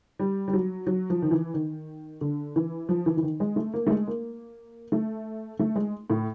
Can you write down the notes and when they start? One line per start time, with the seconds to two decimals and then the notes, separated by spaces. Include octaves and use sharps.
0.19 G3
0.48 G3
0.53 F#3
0.87 F#3
1.10 F3
1.22 D#3
1.31 E3
1.54 D#3
2.21 D3
2.56 E3
2.89 F3
3.06 E3
3.17 E3
3.23 D#3
3.40 G#3
3.56 A3
3.74 A#3
3.87 A3
3.90 G#3
4.07 A#3
4.92 A3
5.59 A3
5.76 G#3
6.10 A2